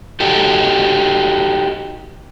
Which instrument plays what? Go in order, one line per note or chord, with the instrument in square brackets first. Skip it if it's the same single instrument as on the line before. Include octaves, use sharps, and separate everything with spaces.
[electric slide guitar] D#4 F#4 G4 A4